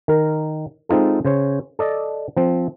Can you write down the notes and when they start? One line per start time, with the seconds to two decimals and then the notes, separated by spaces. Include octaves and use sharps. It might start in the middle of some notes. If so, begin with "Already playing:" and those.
0.08 D#3 A#4
0.89 G#3 C4 D#4 F4 A4
1.25 C#3 C5 C#5
1.79 A4 D5 D#5
2.37 F3 C4